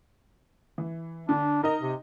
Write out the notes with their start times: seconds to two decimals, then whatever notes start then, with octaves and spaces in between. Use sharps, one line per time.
0.78 E3
1.29 D3 D4
1.64 D#4 A#4 D#5
1.81 C3